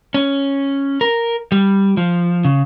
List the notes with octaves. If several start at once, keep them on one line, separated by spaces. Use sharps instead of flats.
C#4
A#4
G3
F3
C#3